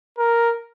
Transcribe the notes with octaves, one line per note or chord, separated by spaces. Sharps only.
A#4